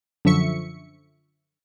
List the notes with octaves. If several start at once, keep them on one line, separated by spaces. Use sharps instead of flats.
F#2 D3 F3 E5 C#6 C#7